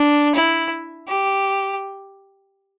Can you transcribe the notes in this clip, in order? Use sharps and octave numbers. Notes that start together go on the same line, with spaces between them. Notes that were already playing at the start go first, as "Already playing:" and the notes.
Already playing: D4
E4
G4